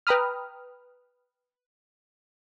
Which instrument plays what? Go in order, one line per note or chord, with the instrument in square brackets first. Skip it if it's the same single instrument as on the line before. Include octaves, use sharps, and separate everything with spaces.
[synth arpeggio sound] B4 G5 A#5 B5 D#6 F6